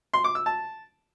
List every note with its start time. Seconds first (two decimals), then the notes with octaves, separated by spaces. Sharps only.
0.14 C6
0.24 D6
0.35 E6
0.46 A5